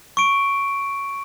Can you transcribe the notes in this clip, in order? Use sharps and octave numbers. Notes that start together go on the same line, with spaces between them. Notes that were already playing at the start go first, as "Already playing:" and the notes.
C#6 D7